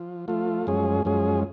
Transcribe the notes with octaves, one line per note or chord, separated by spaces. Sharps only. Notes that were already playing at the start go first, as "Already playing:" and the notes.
Already playing: F3
F3 A3 F4
F#2 F3 G#3 C#4 G#4
F#2 F3 G#3 C#4 G#4